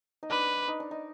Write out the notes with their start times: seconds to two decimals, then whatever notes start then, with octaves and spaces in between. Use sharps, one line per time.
0.23 D#4
0.30 D4 B4
0.68 D#4
0.80 D4
0.91 D#4